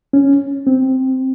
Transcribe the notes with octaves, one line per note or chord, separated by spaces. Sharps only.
C#4
C4